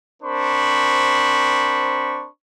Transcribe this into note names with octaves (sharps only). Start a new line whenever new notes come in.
C4 D4 A#4 C5 B5 C#6